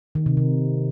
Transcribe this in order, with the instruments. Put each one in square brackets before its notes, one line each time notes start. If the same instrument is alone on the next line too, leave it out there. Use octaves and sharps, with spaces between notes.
[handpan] D#3
C3
C3